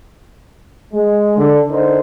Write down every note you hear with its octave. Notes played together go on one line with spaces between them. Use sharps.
G#3
D3
D3 D#4 A#4 C5